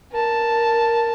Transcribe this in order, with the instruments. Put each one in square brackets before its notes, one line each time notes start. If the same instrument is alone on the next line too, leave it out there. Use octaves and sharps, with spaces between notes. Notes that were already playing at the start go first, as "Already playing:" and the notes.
[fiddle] A#4 A5